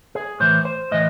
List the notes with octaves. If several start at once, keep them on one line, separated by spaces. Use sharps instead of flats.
G#4
A2 E3 C5
C5
A2 E3 D#5